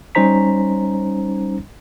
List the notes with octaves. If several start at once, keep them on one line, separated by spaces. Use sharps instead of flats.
G3 C#4 D#4 C5 A#5 B6